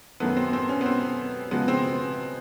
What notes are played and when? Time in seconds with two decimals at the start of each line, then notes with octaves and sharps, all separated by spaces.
0.20 F#2 D#3 F#3 A3 B3
0.37 C4
0.53 C4
0.69 C#4
0.81 B3
0.86 C4
1.51 C#3 F3 G#3 B3
1.68 C4